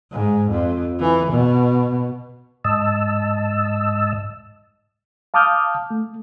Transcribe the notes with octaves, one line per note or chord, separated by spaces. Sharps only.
G#2
F2
E3
B2
G#2 D#5 A5 E6
F5 A5 D6 D#6 F6 G6
A3